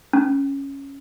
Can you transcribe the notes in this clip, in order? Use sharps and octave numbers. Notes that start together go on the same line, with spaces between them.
C#4